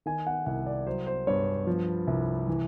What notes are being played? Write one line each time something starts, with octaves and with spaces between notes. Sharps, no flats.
D#3 G#5
F#5
C2 F#5
D5
F#3 C5
C5
G2 C#5
F3
C2
E3